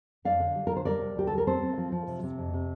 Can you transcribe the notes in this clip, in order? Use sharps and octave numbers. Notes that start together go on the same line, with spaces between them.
F2 D5 F5
D3
G3
D3 A#4
C5
G3 A#4 D5
C3
D2 G4
G3 A4
A#4
C4 A4 C5
C4
F3
F3
C3
C3
F2
C3